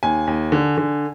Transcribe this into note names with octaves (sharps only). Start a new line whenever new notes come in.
D#2 G#5
D#2
D3
D3